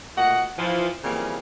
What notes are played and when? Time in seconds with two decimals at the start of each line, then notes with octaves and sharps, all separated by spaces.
0.17 A#2 A3 F#4 D#5 F#5
0.58 E3 F3
1.04 C#3 E3 F3 G3 A#3 C4